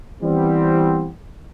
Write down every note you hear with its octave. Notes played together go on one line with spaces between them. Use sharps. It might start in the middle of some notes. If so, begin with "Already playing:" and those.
E3 G3 B3 C4